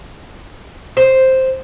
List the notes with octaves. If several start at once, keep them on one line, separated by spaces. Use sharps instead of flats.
C5